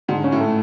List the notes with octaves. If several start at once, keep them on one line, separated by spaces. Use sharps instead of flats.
G#2 D3
C#4
A2
A3